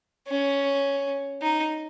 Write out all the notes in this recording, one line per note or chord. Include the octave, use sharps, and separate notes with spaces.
C#4
D#4